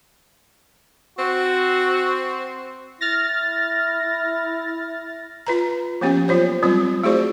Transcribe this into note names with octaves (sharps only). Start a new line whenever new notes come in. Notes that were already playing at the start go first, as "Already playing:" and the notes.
C4 F#4
E4 F6 A6 A#6
F4 B4 A#5
F3 A#3 B3 C#4 G4
F#3 F4 C5 C#5
F#3 G3 C4 F4
A3 E4 F#4 G#4 C5 D5